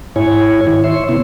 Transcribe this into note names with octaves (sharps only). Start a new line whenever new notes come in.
G#2 E4 C#5 G#5
D#3 E4
C#5 E5 C6
C3 B3 E4